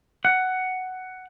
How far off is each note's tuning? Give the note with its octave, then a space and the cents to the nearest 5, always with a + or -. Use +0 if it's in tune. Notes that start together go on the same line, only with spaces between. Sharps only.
F#5 +10